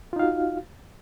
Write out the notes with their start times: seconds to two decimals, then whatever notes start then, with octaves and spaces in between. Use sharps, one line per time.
0.13 F4
0.16 D#4
0.19 F5
0.23 F#4